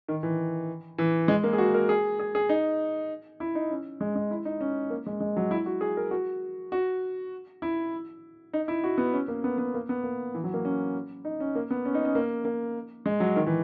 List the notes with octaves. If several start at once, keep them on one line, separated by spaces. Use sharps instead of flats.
D#3
E3
E3
G#3
A#3
G#4
F#4
A#4
G#4
G#4
G#4
D#4
E4
D#4
C#4
G#3
G#3
E4
D#4
C#4
A#3
G#3
G#3
F#3
E4
F#4
G#4
A#4
F#4
F#4
E4
D#4
E4
F#4
B3
C#4
A#3
B3
B3
A#3
B3
A#3
E3
F#3
A#3
C#4
D#4
C#4
A#3
B3
C#4
D#4
C#4
A#3
A#3
G#3
F#3
D#3
E3